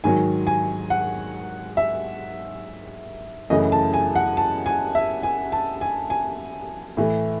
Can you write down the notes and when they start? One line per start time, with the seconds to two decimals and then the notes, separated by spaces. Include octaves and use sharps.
0.04 G#2 D#3 F#3 G#5
0.47 G#5
0.90 F#5
1.77 E5
3.50 F#2 C#3 E3 A3 D#5
3.72 A5
3.94 G#5
4.15 F#5
4.37 A5
4.66 G#5
4.95 E5
5.23 G#5
5.52 A5
5.81 G#5
6.10 G#5
6.97 A2 E3 A3